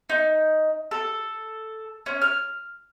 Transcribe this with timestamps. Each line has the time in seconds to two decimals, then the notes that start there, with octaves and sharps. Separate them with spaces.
0.09 D#4
0.91 A4
2.06 C#4
2.21 F6